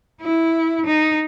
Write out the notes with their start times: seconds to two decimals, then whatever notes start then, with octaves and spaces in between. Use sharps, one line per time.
0.22 E4
0.86 D#4